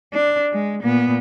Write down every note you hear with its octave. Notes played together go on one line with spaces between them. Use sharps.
D4
G#3
A#2 B3